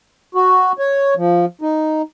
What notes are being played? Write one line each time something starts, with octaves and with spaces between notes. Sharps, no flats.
F#4
C#5
F3
D#4